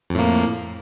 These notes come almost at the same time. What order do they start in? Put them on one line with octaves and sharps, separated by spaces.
F2 A2 A#3